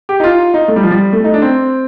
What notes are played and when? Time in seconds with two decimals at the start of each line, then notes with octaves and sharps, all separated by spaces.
0.09 G4
0.20 D#4
0.24 F4
0.54 D#4
0.68 A3
0.76 G3
0.83 F3
0.91 G3
1.13 A3
1.24 D#4
1.34 D4
1.42 C4